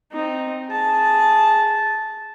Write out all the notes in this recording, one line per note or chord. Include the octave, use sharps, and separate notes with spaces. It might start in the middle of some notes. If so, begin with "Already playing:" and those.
C4 D#4
G#4 A5